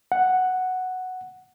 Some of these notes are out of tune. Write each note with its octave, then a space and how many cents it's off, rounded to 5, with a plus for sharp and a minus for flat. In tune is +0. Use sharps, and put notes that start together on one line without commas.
F#5 +0